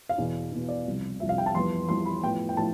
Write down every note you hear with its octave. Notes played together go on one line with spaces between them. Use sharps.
F5
E2 B2 B3
E2 B2 B3
D5
C2 C3 F3
C2 C3 F3 E5
F5
G5
A5
F2 E3 G3 B3 C6
F2 E3 G3 B3 C6
B5
A2 F3 B3 G5
G5
A2 F3 A5